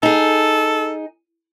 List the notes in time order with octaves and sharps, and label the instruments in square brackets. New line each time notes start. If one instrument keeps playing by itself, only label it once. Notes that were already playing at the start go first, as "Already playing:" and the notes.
[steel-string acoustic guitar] D#4 G#4 [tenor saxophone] A4